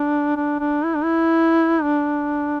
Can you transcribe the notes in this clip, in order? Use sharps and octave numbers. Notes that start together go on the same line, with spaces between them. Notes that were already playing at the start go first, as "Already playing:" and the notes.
Already playing: D4
D4
D4
E4
D4
E4
D4